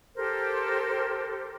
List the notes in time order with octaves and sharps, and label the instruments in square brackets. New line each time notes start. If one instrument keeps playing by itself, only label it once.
[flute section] G4 A4 A#4 C5